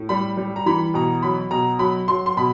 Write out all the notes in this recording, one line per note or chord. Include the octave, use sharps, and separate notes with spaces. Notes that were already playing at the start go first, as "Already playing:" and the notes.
Already playing: A2
G3 B5
G3
A#5
E3 B5
B2 A#5
F#3 B5
B2 A#5
F#3 B5
F#3 C6
C6
B2 B5